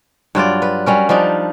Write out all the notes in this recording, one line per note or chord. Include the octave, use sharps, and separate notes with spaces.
G2 F#3 F4 D5
B4
F#3 G3 C#4 A#4
F3 G3 D4 D#4